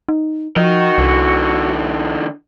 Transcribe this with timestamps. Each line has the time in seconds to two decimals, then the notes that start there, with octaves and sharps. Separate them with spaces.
0.09 D#4
0.56 F3 F#4 A#4 D#5
0.98 C2 D3 E3